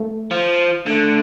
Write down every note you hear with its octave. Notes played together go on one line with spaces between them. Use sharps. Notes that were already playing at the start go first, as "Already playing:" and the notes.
Already playing: A3
F3
D3 A3